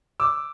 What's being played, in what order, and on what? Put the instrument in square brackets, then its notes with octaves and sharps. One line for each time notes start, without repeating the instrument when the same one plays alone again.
[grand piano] D6 E6